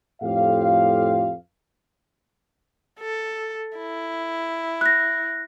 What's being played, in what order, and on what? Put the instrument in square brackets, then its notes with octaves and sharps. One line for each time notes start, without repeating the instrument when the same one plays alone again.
[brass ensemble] F2 A2 F4 G4 F5
[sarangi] A4
E4
[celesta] F#6 A#6